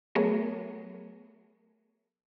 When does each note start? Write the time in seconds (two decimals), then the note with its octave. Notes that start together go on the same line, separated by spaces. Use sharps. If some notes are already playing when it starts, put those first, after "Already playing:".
0.15 F#3 A3 B3 G#4 A#4 C#5